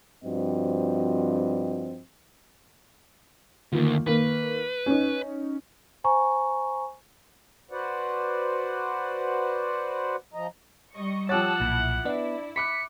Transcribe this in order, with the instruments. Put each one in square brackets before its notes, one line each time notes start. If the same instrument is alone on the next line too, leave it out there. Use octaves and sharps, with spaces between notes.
[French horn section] G2 F3 C4 F#4 D#5
[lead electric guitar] D2 [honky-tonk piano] D#3 A#3 F4
[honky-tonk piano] D#3 A#3 [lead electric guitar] B4
[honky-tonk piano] C#4 D#4
[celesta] C5 G#5 A#5 C#6
[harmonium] F#4 B4 C5 D5 F#5
F3 D#5 A#5
[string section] G3 D#5 C#6
[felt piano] F3 D6 A6 [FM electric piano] G4 C#5 [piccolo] F#5 [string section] A5 E6
[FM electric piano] B1 A#2 [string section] E4
[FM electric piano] B3 [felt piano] D4 [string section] E4
[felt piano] B5 D6 F#6 [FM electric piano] B6 [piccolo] C#7